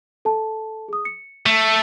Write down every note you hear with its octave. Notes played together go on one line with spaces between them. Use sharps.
A4 A5
G#4 D#6
C#7
A3